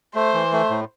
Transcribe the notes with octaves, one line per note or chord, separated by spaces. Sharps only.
A3 C5
E3
A3
A2